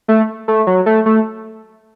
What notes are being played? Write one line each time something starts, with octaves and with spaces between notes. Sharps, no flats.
A3
A3
F#3
A3
A3